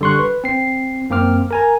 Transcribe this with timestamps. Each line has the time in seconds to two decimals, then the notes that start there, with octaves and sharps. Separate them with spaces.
0.01 D3 G3 C6 C#6 F#6
0.19 B4
0.44 C4 C7
1.10 F#2 A#3 C4 D6 F6
1.51 A#4 G#5 A#5